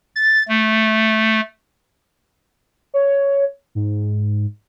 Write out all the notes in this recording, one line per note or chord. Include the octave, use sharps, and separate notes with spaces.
A6
A3
C#5
G#2